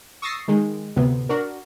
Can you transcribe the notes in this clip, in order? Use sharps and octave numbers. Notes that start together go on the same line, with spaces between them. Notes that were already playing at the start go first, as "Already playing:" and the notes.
C#6 D#6 E6 A6 A#6 C7
D#3 G#3
D2 A2 C3 B3
D4 F#4 A#4